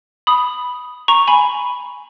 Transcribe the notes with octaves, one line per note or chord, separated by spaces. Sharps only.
B5 D#6
A#5 C#6
G#5 B5